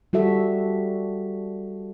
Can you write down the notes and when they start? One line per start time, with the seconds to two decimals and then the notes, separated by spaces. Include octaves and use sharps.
0.13 G3 F#4 A4 E5